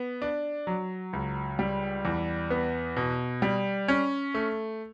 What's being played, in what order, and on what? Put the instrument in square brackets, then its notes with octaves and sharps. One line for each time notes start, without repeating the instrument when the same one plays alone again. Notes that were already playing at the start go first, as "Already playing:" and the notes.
Already playing: [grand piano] B3
D4
F#3
C#2
G3
E2
B3
B2
G3
C#4
A3